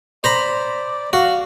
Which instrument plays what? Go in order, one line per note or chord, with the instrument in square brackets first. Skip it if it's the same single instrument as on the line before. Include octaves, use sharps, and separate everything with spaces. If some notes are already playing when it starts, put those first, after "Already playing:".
[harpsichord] C5 A#5 B5 [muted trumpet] D5
[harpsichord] F#4 [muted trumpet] F5